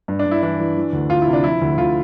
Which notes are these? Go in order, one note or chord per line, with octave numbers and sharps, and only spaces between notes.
G2
D4
G2
E4
E3 D4
E3
E3
D2
D2 F4
E4
C3
D4
F3 E4
D2
D2 F4